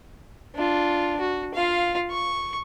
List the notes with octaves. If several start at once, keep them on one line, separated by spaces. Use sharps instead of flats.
D4 F4
F#4
F4 F5
C#6